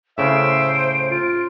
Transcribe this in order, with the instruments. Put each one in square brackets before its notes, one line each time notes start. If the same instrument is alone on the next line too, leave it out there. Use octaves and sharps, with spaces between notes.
[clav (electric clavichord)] A2 C#3 [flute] C5 [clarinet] E5 [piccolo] D7
[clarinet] F4